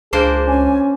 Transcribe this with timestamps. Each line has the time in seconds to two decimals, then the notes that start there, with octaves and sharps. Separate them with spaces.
0.13 C#2 A#3 D4 G#4 C5
0.48 C#4 G#5